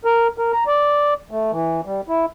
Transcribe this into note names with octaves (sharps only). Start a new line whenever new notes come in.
A#4
A#4
A#5
D5
A3
E3
G3
E4